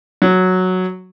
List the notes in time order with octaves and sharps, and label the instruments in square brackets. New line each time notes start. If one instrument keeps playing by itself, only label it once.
[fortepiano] F#3